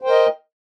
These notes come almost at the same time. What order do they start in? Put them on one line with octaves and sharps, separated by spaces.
C5 G5 A#4 D#5